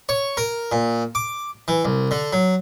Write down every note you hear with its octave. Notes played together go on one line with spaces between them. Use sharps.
C#5
A#4
A#2
D6
E3
C2
D3
F#3